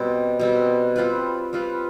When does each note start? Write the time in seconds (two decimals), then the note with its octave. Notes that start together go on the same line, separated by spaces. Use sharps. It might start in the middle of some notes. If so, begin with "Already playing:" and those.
Already playing: B2 G3 C4
0.39 B2 G3 C4
0.96 G3 C4 F4 B4
1.53 G3 C4 F4 B4